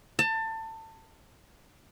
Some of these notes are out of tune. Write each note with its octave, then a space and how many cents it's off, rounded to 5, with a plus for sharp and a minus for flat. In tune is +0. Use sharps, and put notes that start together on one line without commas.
A5 +25